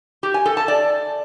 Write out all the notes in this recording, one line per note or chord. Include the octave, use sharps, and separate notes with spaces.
G4
G#5
A4
A5
D5